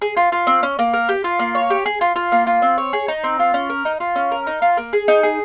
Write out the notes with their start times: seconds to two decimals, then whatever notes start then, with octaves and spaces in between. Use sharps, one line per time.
0.02 G#4
0.17 F4
0.32 F4
0.47 C4
0.63 C#4
0.79 A#3
0.93 A#4
1.09 G4
1.24 F4
1.39 A#3
1.55 C#5
1.70 G4
1.86 G#4
2.01 F4
2.16 F4
2.32 A#3
2.47 F4
2.62 C4
2.78 C#5
2.93 G#4
3.08 D#4
3.24 C4
3.39 F4
3.54 C#4
3.70 A#4
3.85 D#4
4.00 F4
4.16 C#4
4.31 A#4
4.47 D#4
4.62 F4
4.77 A#3
4.93 G#4
5.08 D#4
5.23 G#4